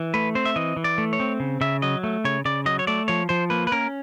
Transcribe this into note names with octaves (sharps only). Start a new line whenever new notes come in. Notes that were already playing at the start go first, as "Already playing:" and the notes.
Already playing: E3
A3 B4
C4 C5
E5
E3 D#5
E3
D5
A3
C#5
C4
C#3
C#3 E5
F#3 D#5
A3
C#3 C#5
C#3 D5
F#3 D#5
C#5
A3 D5
F3 C#5
F3 C5
A#3 B4
B4
C#4 A#4